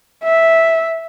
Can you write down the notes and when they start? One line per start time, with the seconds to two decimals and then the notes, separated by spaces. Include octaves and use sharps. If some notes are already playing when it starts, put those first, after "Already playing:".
0.24 E5